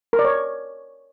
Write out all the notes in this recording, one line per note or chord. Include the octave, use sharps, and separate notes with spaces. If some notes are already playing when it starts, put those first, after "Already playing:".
A#4
D5
C#5